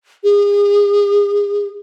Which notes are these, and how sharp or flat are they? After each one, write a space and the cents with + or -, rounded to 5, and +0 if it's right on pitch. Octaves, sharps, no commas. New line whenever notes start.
G#4 -35